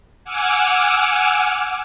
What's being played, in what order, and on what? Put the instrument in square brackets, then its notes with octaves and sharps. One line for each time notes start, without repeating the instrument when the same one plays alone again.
[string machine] F#5 G#5 D6 E6 F6